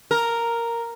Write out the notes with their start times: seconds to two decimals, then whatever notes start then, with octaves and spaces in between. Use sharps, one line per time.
0.11 A#4